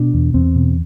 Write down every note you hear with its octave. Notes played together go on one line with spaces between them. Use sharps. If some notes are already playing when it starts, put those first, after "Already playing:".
Already playing: B2 D4
E2
E2 C4
B2